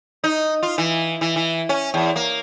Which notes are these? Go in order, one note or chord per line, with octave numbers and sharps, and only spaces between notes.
D#4
F4
E3
E3
E3
C#4
E2
A#3